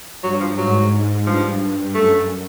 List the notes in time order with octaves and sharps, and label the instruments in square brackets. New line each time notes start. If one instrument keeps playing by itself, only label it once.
[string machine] G2 [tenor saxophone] F#3
[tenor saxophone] F3
[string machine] G#2 [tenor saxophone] F#3
[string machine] G2 [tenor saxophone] F3
[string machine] G2
[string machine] F#2 [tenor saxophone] A3